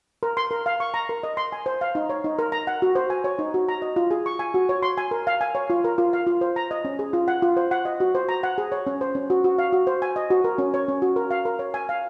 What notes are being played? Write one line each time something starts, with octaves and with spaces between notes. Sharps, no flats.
A#4
C6
A#4
F5
C#6
A#5
A#4
D#5
C6
G#5
C5
F5
D#4
C#5
D#4
A#4
A#5
F#5
F#4
C5
G#5
C#5
D#4
F#4
A#5
D#5
F4
G#4
C#6
G#5
F#4
C#5
C6
G#5
A#4
F5
G#5
C#5
F4
A#4
F4
F5
F4
C5
A#5
D#5
C#4
G#4
F4
F#5
F4
C5
F#5
D#5
F#4
C5
A#5
F#5
G#4
C#5
C#4
C5
C#4
F#4
F#4
F5
F#4
C5
G#5
D#5
F#4
A#4
C#4
C#5
C#4
F#4
A#4
F5
A#4
C#5
G#5
F5